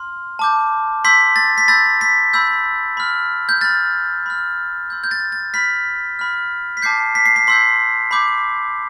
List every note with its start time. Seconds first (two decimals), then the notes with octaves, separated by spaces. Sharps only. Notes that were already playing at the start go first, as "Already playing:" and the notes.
Already playing: C6 F6
0.39 A5 D6 G6
1.04 C6 E6 G6 B6
1.36 A6
1.58 B6
1.68 B5 E6 G6 A6
2.01 B6
2.33 B5 E6 G6
2.97 B5 F6
3.49 G6
3.61 B5 F6 A6
4.26 B5 F6
4.90 C6 E6 G6
5.04 G6
5.11 A6
5.32 A6
5.54 B5 F6 B6
6.19 B5 F6
6.77 B6
6.82 A5 D6 G6 C7
7.15 B6
7.25 C7
7.36 B6
7.47 C6 E6 G6 B6
8.11 B5 D6 G6